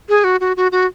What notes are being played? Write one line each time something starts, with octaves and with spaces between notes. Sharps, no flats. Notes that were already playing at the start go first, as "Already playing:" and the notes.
G#4
F#4
F#4
F#4
F#4